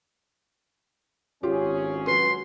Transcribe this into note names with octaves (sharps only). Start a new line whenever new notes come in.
G#1 C#4 F4 G4 G#4
F#3 B4 C6